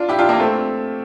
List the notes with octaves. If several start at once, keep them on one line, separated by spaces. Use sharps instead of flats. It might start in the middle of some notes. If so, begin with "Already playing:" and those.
Already playing: D4 F4
E4 G4
D4 F4
A#3 D4
A3 C4